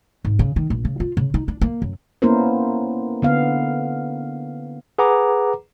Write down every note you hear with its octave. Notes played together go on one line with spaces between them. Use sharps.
G#1
C#3
D#3
A#1
C#3
F4
C#3
D#4
D4
A#3
F#2
A#3 B3 C#4 E4 A#4 C5
D3 B3 F5
G#4 B4 F#5 A#5 D6